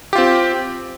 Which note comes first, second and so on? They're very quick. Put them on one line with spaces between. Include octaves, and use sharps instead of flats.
G4 F4 C4